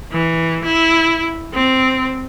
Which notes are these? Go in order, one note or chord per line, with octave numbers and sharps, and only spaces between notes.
E3
E4
C4